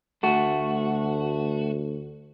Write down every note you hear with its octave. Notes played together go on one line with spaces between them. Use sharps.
D2 A3 F#4